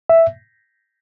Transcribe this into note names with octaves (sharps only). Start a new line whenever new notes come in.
E5